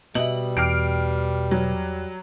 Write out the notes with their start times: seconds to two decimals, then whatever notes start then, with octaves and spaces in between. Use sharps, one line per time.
0.15 B2 G3 D#5 E5 F#7
0.57 E2 G5 D6 F6 C7 D7
1.51 F#3